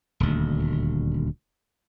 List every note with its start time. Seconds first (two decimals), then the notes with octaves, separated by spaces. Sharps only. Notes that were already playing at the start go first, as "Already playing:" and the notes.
0.20 D#1 D2